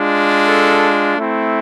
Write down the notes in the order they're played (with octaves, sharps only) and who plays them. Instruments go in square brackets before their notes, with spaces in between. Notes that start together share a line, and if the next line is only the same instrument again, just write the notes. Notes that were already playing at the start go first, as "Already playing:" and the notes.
Already playing: [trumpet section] G#3 D4 F4
A4
A3 C4 E4